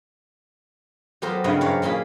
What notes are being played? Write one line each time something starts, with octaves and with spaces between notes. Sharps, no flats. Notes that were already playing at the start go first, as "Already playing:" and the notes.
F#3 B3 G4 A4 A#4 C5
G2 C#3 C4 E4 D#5 F5
F#2 F#3 C#5 D5 F5
A#2 A#3 C#4 G#4 F5 B5